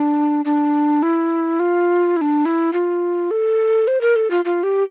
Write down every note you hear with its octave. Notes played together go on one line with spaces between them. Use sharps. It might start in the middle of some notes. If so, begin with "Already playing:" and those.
Already playing: D4
D4
E4
F4
E4
D4
E4
F4
A4
C5
A#4
A4
F4
F4
G4